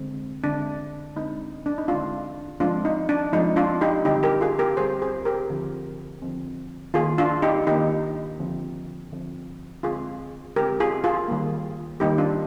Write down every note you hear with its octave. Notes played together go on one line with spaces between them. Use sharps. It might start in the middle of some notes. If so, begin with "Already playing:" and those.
Already playing: D3 G#3 C4
D3 G#3 C4 D4
D3 G#3 C4 D#4
D4
D#4
D3 G#3 C4 D4 F4
F3 G#3 C4 D4 F4
D#4
D4
F3 G#3 C4 D#4
D4 F4
D#4 G4
D3 G3 C4 D#4 G4
G4 A#4
F4 G#4
G4 A#4
D3 G3 C4 G#4 C5
G#4 C5
G4 A#4
D3 F3 C4
D3 F3 C4
D#3 A#3 F4 G#4
D4 F4
D#4 G4
D#3 A#3 D#4 G4
D3 F3 C4
D3 F3 C4
D3 G#3 C4 F4 G#4
D3 G#3 C4 G4 A#4
F4 G#4
F4 G#4
D#3 G3 A#3
D#3 G3 A#3 D#4 G4
D4 F4